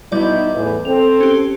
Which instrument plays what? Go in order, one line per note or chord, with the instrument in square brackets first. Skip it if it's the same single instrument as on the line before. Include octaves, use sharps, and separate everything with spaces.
[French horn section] B2 D#4 E4 [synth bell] G3 D5
[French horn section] E2 A2 E3
[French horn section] C4 A4 [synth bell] F7
[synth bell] C#4 G4